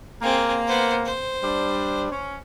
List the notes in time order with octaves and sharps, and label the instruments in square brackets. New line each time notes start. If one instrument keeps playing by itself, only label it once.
[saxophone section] A#3 [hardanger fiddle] C4 G#4
[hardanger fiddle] B3 C5
C5
[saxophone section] G3 D4
C#4